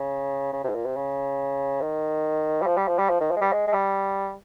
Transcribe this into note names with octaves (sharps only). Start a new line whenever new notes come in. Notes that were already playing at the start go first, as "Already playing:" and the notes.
Already playing: C#3
C#3
C3
G#2
A#2
C3
C#3
D#3
G3
F3
G3
F3
G3
F3
D#3
F3
G#3
G3
G#3
G#3
G3